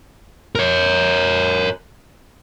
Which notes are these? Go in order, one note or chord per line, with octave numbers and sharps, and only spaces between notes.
A#4 C#5